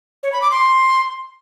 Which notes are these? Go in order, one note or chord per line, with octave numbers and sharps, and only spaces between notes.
C#5
B5
D6
C6